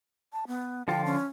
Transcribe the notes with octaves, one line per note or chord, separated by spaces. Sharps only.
A5
B3
D3 F3 F4 G5
C#4